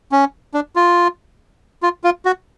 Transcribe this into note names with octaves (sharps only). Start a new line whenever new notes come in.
C#4
D4
F4
F4
F4
F#4